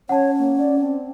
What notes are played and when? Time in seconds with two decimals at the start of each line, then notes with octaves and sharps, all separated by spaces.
0.09 C#4 C#5 F#5 A5
0.39 A#3
0.58 D5
0.80 C4